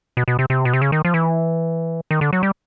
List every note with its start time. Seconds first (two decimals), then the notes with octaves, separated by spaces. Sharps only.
0.17 B2
0.28 B2
0.39 C3
0.50 C3
0.65 B2
0.73 C3
0.82 C#3
0.92 D#3
1.05 F3
1.14 E3
2.11 D#3
2.21 D3
2.33 F#3
2.43 G3